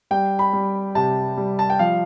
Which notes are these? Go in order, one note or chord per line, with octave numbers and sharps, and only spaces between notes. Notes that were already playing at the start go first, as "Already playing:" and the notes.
G3 G5
B5
G3
C3 A5
G3
A5
G5
F3 F5